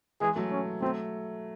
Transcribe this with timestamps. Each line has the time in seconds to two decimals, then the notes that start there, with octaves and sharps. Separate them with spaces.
0.21 E3 G#3 G#4
0.36 F#3 A3
0.51 C#4
0.81 F#3 A3 C4